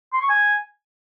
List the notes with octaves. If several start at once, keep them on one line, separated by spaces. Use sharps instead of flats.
C6
C#6
G#5